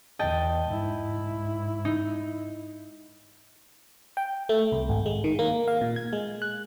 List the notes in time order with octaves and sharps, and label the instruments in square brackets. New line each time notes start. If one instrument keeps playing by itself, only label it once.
[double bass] E2 [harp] D#5 G5 A5
[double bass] G#2 E4
[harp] D#4
[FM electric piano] G5
A3
C2
G#1
G#3
D#3
A#3
F5
A#2
G#6
G#3
F#6